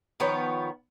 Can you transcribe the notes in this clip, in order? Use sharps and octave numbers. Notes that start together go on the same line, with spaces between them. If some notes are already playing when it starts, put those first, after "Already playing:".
D#3 F3 B3 C#5